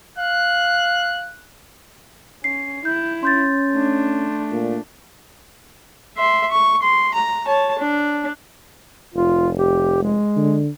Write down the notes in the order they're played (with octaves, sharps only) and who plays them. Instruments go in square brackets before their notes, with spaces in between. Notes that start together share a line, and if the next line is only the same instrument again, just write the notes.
[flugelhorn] F5 [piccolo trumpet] F#6
[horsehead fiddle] C#4 [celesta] C7
[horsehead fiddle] E4 [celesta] G6
[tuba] C#4 [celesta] C6 G6 A6
[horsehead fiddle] A3 D4
[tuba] A#2
[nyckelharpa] E5 C6
C#6
C6
A#5
C#5 A5
D4
[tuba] F1 [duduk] F4
[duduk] G4
G#3
[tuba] D3